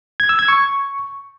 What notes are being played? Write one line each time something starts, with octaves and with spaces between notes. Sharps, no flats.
G#6
E6
G#6
C#6